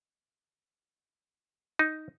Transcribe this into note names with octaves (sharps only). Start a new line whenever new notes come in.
D#4